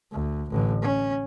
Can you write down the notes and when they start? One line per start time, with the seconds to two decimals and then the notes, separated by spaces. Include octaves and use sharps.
0.12 D2
0.50 A1 D3
0.82 C#4